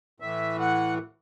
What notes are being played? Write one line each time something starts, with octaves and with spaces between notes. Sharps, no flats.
A2 E3 E5
F#5